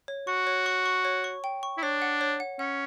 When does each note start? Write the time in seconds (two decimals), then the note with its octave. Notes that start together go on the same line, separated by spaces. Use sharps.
0.08 C#5
0.27 F#4 C#6
0.47 C#5
0.66 C#6
0.86 C#6
1.05 C#5
1.24 C#6
1.44 G5
1.63 C#6
1.78 E4
1.83 D4 C#5
2.02 F#5
2.21 C#5
2.40 F#5
2.59 C#4 F#5